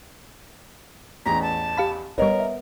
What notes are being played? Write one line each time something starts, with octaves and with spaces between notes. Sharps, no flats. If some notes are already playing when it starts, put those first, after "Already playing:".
A1 E2 A#5 B6
A5
G4 F5 B5
G1 G3 B3 A#4 C#5 D#5
E5